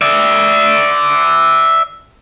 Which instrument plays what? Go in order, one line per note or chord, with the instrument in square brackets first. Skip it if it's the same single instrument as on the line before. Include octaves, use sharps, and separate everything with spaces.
[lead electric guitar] D5 E5